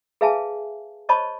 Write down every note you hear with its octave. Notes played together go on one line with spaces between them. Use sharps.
G#4 B4 E5 F5 G#5 A5
C5 C#5 D#5 A5 B5 C#6